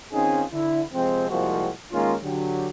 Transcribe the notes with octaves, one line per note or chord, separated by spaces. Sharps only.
D#3 C4 C#4 D#4 F4 G#4
D3 E4
C3 F3 G#3 C4
C2 F3 G#3 A#3 C4 F#4
D#3 G#3 A#3 C#4 F4
D3 F#3 G4